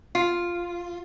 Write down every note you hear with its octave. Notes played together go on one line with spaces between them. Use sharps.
F4